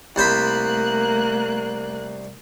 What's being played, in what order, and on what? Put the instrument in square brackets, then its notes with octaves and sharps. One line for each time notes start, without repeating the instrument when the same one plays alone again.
[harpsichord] C2 C5 B5 [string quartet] A3 A#3 F#6